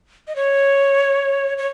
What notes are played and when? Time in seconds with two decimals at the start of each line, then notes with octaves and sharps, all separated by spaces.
0.28 D#5
0.36 C#5
1.58 C#5